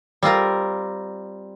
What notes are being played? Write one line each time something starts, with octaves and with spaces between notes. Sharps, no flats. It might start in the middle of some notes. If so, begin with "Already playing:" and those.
G3 C4 F4 A#4